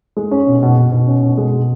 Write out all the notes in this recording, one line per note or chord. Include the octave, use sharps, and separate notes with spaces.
G#3
C#4
B2
B2
B2
B2
C#4
B2
G#3
B2